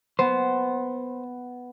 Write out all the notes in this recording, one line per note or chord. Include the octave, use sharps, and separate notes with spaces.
B3 C5